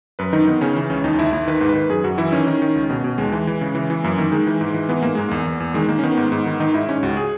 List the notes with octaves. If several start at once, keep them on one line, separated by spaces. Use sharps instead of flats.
F#2 B4
D#3 D#4
D#3 B3
C#3 C#4
E3
C#2 C#4
D#2 D#4
D#2 E4
D#2 E4
D#3 B4
G#2
B4
D#3
F#2 G#4
F#2 F#4
E3 E4
D#3 C#4
D#3
D#3
C#2
B2
B2
D#2 G#3
E3
E3
C#3
E3
E3
F#2 A#3
D#3 A#3
D#3 G#3
E3
G#2
E3
E3 B3
G#2 A#3
G#2 G#3
E2 A#3
E2
E2
D#3 G#3
D#3 A#3
C#4
D#3 B3
G#2
G#2
D#3
D#3 D#4
G#2 E4
G#2 C#4
C#2 F#4
G#4